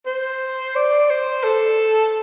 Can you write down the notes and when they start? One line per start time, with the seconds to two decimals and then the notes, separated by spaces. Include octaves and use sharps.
0.06 C5
0.76 D5
1.10 C5
1.44 A4